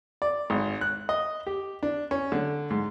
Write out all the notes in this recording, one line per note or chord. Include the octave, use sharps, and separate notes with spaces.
D5
G#1
F#6
D#5
G4
D4
C#4
D3
G#2